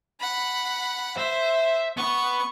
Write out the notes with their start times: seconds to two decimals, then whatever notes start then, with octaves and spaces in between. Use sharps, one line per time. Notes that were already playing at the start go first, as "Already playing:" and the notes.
0.20 F#5 B5
1.17 C5 E5
1.97 B3 B5 C#6